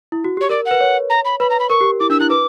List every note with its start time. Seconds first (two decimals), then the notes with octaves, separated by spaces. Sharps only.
0.12 E4
0.24 F#4
0.37 G4 C#5
0.49 A#4 D5
0.65 F#5
0.71 B4
0.81 C#5
1.10 A#5
1.25 B5
1.40 B4 B5
1.50 A#5
1.60 B5
1.70 A#4 C#6
1.81 G4
2.00 E4 D6
2.10 D4 E6
2.20 E4 F#6
2.30 B4 D6